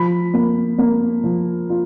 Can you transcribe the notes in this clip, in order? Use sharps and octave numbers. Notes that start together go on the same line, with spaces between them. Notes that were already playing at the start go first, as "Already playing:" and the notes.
Already playing: F3 B5
A#3
A#3
F3
F4